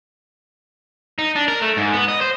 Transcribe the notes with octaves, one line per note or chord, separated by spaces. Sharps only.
D#4
D4
A#4
A3
G#2
B3
D#5
C5